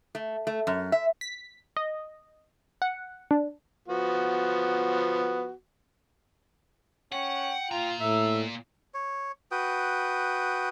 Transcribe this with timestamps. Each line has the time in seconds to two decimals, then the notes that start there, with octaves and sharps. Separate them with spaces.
0.15 A3
0.47 A3
0.67 F#2
0.92 E5
1.21 B6
1.77 D#5
2.82 F#5
3.31 D4
3.88 F3 B3 F#4
7.12 C#4 F#5 G5
7.71 A#2 F4 A#5
8.01 A2 E5 E6
8.94 C#5
9.51 F#4 B4 G5 D#6